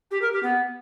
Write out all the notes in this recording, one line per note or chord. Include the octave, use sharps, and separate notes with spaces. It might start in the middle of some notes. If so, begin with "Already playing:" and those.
G4
A#4
G4
B3